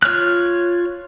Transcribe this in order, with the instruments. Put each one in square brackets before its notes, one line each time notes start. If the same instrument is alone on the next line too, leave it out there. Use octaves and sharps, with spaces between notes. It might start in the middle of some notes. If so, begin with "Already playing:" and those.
[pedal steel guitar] F4 C#5 F6 F#6